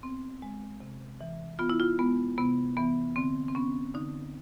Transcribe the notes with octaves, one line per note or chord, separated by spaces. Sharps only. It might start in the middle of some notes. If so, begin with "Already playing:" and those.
B3 C4
G#3
C3
E3
B3 F4
E4
F4
G#3 B3
C3 B3
E3 B3
D3 C4
C4
B3 C#4
D3 D#4